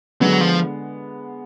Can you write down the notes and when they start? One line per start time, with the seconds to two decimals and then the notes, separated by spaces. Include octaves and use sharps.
0.21 D3 F#3 G#3 B3
0.41 F3